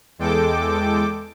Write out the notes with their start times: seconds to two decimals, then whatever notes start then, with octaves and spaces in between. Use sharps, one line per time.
0.18 E2 G#3 A4 G5 D6